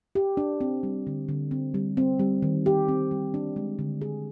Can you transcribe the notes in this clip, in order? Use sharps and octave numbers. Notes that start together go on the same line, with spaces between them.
G4
D4
C4
G3
D3
D3
C4
G3
C4
G3
D#3
G4
C4
G3
D4
G#3
D3
G#4